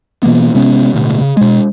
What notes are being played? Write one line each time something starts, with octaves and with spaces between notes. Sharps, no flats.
B2 E3 A#3 B3
C3 G#3 B3 C#4
D1 D2 B2
C#3
B2 G#3